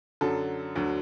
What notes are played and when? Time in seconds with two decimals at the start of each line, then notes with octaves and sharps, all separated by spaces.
0.21 F#2 D3 F#3 A4
0.76 D2 D3 F#3